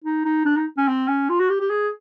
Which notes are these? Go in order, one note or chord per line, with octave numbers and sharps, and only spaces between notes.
D#4
D#4
D4
D#4
C#4
C4
C#4
F4
F#4
G4
G4
G#4